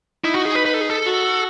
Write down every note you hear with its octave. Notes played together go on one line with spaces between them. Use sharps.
D#4 E4
F#4
G#4
B4
B4
A4
G#4
A4
F#4